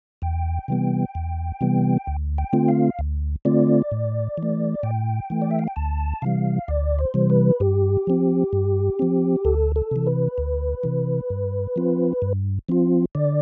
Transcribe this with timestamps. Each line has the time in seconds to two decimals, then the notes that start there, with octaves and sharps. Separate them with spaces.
0.22 E2 G5
0.68 C3 E3 G3 B3
1.15 E2
1.61 C3 E3 G3 B3
2.07 D2
2.38 G5
2.53 D3 A3 C4 F4
2.68 F5
2.99 D2
3.45 D3 A3 C4 F4 D5
3.92 A2
4.38 E3
4.43 A3
4.83 A2 G5
5.30 E3 A3
5.42 D5
5.51 E5
5.59 F5
5.68 G5
5.76 D2 A5
6.22 C3 E3 G3 F5
6.68 D2 D5
6.99 C5
7.14 C3 E3 G3
7.30 B4
7.60 G2 G4
8.07 F3 C4
8.53 G2
8.99 F3 C4
9.45 D2 A4
9.76 A4
9.91 C3 E3
10.07 B4
10.38 D2
10.83 C3 E3
11.30 G2
11.76 F3 C4 F4
12.22 G2
12.69 F3 C4 F4
13.15 D3 D5